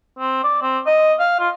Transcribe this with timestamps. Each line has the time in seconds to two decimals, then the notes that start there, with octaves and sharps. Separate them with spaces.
0.19 C4
0.44 D5
0.62 C4
0.86 D#5
1.19 F5
1.39 F4